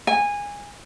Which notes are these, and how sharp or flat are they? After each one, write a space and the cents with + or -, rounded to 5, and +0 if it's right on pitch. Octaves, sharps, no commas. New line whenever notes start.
G#5 -20